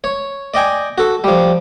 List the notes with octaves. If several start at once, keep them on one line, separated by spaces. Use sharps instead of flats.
C#5
D5 D#5 G5 G#5
F#4 A4
F3 G3